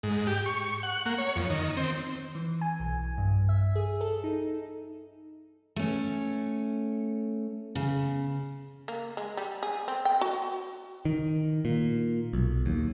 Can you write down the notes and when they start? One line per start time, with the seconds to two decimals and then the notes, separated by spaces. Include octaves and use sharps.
0.03 G#2
0.27 G4
0.46 C#6
0.83 F#5
1.06 A#3
1.18 C#5
1.36 F2
1.50 D#3
1.77 C4
2.35 E3
2.61 G#5
2.80 B1
3.18 G2
3.49 E5
3.75 G#4
4.01 A4
4.24 D#4
5.76 A3 C#4
7.75 C#3
8.88 A#3
9.17 G#3
9.37 G3
9.63 G#4
9.88 C4
10.05 G5
10.21 F#4
11.05 D#3
11.65 A#2
12.33 B1
12.66 D#2